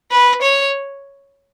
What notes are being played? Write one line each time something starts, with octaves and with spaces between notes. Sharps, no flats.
B4
C#5